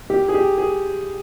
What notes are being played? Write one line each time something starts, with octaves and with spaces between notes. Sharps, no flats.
G4
G#4
G4
G#4